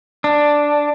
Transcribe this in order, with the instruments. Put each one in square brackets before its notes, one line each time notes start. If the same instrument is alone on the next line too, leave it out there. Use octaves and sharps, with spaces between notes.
[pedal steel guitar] D4